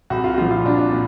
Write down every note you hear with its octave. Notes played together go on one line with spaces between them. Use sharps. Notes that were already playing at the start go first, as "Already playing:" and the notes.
C2 F#4
F4
F#4
A#2 F3 F4
F4
C2 D4
D4
A#2